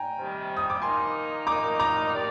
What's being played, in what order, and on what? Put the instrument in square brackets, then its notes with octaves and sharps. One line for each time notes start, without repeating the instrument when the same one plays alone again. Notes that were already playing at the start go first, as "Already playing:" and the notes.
Already playing: [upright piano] G5 G#5 A#5
[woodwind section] C3 D#3 G3
[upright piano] D#6
D6
[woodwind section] D#3 A#3 D#4 [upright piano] G#5 C6
[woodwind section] D#3 A#3 D#4 [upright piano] A#5 D6
[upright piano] A#5 D6
[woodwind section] D#3 G3 D4 G4 D5